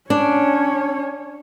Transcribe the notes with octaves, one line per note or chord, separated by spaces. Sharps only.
C#4 D4 C#5